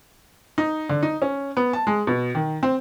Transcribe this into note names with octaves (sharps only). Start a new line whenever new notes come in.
D#4
D3
D#4
C#4
B3
A5
G#3
B2
D#3
C4